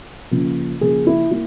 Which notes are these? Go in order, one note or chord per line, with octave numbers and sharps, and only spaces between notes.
C#3 F3 A#3
C#3 F3 A#3 G#4
E4
A#3 E4